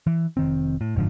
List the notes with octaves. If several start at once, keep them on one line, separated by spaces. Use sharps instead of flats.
E3
F1 D#3 C4
A2
F#1 G#2 D3 F3